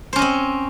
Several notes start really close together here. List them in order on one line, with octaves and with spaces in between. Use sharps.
C5 C#4 D#5 C4